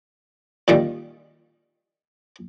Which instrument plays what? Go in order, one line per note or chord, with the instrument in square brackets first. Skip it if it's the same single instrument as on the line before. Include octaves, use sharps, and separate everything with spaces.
[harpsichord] A#2 D#3 G3